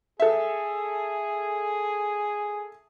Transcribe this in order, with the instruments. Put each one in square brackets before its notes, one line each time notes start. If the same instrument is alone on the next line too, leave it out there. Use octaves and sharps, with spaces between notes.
[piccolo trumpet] G#4 [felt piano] A4 E5